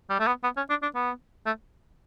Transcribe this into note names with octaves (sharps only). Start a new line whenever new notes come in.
G3
A3
B3
B3
C#4
D4
D4
B3
A3